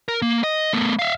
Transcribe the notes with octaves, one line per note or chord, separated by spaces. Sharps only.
A#4
A#3
D#5
A3 B3
E5 F5